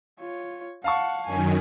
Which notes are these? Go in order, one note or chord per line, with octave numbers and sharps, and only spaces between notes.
F4 C#5
F5 F#5 A5 C#6
F#2 D#3 C#4 G#5